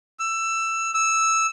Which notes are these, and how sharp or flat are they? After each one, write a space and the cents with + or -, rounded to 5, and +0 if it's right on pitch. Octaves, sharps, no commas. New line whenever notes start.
E6 +15
E6 -5